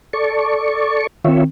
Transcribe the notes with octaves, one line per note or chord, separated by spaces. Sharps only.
A4 D5 C#6
D#3 C4 F4 C#5 E5